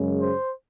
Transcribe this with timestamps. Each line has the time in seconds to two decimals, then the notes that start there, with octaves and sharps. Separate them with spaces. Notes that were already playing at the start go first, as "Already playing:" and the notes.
Already playing: F#2 C#3 G#3
0.20 C5